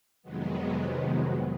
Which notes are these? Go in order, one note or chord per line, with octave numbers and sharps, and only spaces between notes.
F2 C3 D#3 F#3 G#3 B3